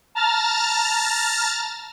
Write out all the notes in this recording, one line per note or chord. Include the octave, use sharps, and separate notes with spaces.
A5 A#5 F6 A6